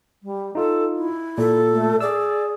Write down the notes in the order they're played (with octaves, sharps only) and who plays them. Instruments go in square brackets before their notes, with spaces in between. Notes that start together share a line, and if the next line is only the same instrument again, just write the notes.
[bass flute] G3
[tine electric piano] D#4 F4 [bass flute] A4
[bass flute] E4
[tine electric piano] A#2 [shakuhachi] A4
[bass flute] A3
[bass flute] G#4 [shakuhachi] D5 [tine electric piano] E6